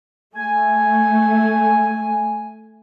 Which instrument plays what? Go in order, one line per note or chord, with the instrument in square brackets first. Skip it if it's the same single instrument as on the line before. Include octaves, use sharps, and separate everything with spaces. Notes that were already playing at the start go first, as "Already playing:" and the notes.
[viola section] A3 [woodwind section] G#5